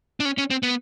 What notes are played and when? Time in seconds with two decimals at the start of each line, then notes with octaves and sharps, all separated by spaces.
0.20 D4
0.25 C#4
0.38 C#4
0.50 C4
0.63 B3